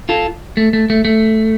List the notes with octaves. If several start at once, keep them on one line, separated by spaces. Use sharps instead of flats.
F4 A4
A3
A3
A3
A3